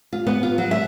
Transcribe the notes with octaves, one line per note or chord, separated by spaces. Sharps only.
F4
B3
F4
F#3
E5